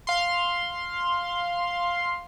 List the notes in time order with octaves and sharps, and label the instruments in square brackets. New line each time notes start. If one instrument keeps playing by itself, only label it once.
[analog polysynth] F5 C6